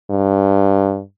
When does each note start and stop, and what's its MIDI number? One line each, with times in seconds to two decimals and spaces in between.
0.10 1.01 43